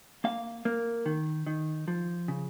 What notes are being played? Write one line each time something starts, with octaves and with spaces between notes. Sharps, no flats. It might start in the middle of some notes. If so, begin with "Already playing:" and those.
A#3 F5
A#3
D#3
D#3
F3
C#3